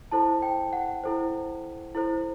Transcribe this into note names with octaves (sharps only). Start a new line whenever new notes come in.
E4 A4 C5 A5
G5
F#5
E4 A4 C5
E4 A4 C5